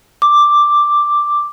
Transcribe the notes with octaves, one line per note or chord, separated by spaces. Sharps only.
D6